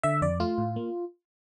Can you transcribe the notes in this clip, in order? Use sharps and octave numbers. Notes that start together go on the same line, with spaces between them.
D3 E5
F2 D5
A3 F4
A2
A#3